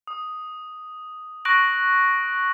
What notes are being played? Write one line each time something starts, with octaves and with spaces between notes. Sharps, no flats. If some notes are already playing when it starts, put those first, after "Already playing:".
D#6
C#6 F#6 A#6 D7 F#7